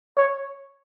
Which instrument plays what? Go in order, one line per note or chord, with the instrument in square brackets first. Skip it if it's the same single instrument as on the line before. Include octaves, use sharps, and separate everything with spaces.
[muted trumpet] C#5